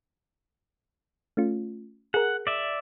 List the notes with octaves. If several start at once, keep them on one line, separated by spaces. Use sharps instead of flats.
A3 C#4 F4
G#4 A#4 F#5
D5 E5